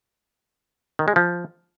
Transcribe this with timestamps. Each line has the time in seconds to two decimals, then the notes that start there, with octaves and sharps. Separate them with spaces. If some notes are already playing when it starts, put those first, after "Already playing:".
0.99 D#3
1.08 G#3
1.16 F3